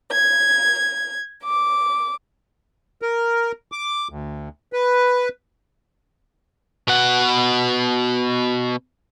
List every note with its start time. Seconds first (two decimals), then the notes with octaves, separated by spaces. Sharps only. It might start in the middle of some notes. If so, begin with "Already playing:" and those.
0.11 G#6
1.44 D6
3.02 A#4
3.72 D6
4.10 D2
4.73 B4
6.88 B2 F#5